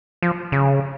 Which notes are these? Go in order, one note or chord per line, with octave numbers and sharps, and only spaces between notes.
F3
C#3